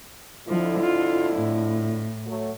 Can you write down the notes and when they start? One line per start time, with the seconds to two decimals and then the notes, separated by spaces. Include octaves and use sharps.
0.48 F2 D3 F3 E4
0.80 F4
1.36 A2
2.26 F#3 A3